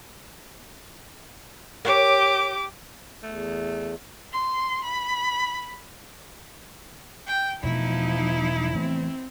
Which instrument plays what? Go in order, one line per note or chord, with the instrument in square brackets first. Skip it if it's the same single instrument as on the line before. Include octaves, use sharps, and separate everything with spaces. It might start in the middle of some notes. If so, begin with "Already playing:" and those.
[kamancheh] G4 D6 [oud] A#4 C5 C#5
[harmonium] E2 [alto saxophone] A3
[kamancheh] C6
B5
[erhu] G5
[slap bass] E1 B2 A3 [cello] F3 D#4 [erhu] E4
[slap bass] E3 A3 B3 [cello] C4